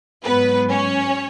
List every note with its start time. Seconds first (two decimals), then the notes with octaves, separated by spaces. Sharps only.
0.25 G#2 F#3 B3 B4
0.71 C#4 C#5